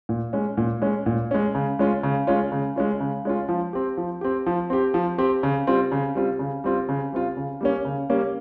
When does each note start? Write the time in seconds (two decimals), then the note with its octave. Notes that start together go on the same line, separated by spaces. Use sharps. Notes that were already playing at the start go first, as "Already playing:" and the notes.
0.09 A#2
0.33 G#3 C#4
0.58 A#2
0.82 G#3 C#4
1.06 A#2
1.31 G#3 C#4
1.55 C#3
1.79 G#3 C#4 F4
2.03 C#3
2.27 G#3 C#4 F4
2.52 C#3
2.76 G#3 C#4 F4
3.00 C#3
3.25 G#3 C#4 F4
3.49 F3
3.73 C4 G4
3.97 F3
4.21 C4 G4
4.46 F3
4.70 C4 G4
4.94 F3
5.18 C4 G4
5.43 C#3
5.67 G3 C4 F4
5.92 C#3
6.15 G3 C4 F4
6.39 C#3
6.64 G3 C4 F4
6.89 C#3
7.12 G3 C4 F4
7.37 C#3
7.61 G3 A#3 C#4
7.85 C#3
8.10 G3 A#3 C#4